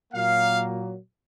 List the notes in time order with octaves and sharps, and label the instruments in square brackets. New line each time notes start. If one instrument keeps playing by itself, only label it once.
[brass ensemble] A#2 F#3 A#3 F5